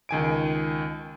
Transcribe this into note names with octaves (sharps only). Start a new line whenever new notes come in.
C#2 D#3 G#5 D7